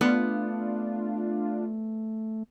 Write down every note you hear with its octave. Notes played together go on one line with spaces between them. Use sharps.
A3 B3 D4 F4